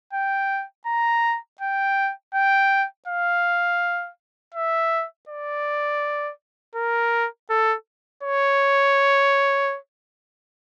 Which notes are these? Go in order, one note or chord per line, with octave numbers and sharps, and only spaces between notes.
G5
A#5
G5
G5
F5
E5
D5
A#4
A4
C#5